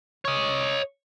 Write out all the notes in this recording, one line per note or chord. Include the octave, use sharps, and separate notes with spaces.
C#5 D#5